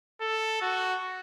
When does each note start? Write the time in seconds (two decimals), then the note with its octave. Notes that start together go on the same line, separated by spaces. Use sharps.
0.21 A4
0.62 F#4